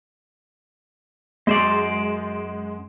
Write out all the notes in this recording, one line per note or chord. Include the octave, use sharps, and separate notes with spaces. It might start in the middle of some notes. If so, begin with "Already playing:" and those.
F#2 G#3 C5 D5